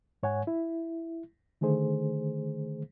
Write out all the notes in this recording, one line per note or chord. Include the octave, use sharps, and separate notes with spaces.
G#2 C#5 F#5 G#5
E4
D3 D#3 A3 G#4 C5